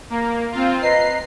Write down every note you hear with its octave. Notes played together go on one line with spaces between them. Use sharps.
A#3 A#5
C4 F4
B4 D#5 A#5 C7